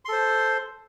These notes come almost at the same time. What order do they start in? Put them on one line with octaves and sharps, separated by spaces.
C6 A4 C5